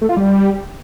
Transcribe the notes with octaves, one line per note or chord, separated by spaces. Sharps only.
A3
F4
G3